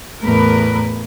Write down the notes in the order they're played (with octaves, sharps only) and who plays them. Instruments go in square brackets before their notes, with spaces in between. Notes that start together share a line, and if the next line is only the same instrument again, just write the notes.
[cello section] E2 A2 A3 A#4 B4